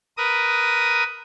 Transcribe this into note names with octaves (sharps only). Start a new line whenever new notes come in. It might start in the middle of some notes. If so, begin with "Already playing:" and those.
A#4 B4 D#6